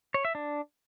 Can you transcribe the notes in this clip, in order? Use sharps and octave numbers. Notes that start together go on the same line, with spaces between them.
C#5
E5
D4